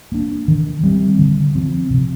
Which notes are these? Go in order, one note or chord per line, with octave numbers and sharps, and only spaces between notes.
A#3 D4
D#3
G3 C4
D3
F3 C4
C3